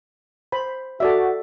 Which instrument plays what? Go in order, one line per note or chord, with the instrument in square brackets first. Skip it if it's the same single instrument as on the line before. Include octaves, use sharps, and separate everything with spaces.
[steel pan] C5 B5
[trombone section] F#4 [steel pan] A4 D5 E5